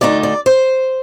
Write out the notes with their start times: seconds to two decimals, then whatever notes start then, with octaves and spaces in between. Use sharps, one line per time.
0.01 D2 D3 A3 D#4 D5
0.23 D5
0.46 C5